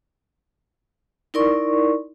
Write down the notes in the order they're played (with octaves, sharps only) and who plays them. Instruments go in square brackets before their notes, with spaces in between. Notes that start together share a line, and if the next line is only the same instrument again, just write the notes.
[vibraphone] D#4 E4 A#4 D5 C6 C#6